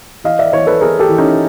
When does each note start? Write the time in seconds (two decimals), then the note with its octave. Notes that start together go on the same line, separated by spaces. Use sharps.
0.24 E3 D#5 F5
0.39 D5 E5
0.52 E3 C#5 D#5
0.67 A4 B4
0.81 E3 G#4 A#4
0.99 G4 A4
1.09 E3
1.18 C#4 D#4